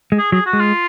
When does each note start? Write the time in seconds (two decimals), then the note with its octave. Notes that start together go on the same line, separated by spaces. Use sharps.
0.12 G#3
0.18 G#4
0.32 F#3 G#4
0.46 F#4
0.53 G#3
0.60 F4